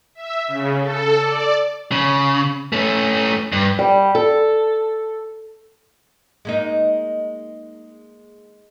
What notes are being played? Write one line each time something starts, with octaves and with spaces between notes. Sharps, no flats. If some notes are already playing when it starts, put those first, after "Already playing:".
E5
C#3
A4
D5
C#3
A3 C#4
G2
G3
A4
G#3 A#3 D#4